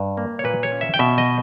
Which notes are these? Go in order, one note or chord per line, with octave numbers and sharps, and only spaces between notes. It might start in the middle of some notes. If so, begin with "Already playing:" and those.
Already playing: G2
A#3
C#5
A#2 B4
C#5
C#4
E5
G5
B2 E5
D#5